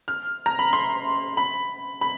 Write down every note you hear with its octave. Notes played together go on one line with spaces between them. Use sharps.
F6
A#5
B5
C6
B5
B5